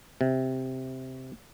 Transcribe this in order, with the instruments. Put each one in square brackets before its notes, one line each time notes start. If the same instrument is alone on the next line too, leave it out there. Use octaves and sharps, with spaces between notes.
[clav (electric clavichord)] C3